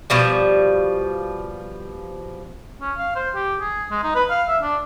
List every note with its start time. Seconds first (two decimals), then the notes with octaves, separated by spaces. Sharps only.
0.10 B2 F3 G3
2.81 C#4
2.98 F5
3.16 C5
3.35 G4
3.60 G#4
3.91 G#3
4.03 D#4
4.15 B4
4.30 F5
4.48 E5
4.63 D4